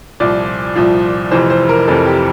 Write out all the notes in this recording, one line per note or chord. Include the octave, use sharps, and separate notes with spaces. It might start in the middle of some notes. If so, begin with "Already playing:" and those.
C2 A#2 F3 D5
C2 A#2 F3
F1 F2 C3 E3 C5
C5
A#4
F1 F2 C3 E3 A4
G4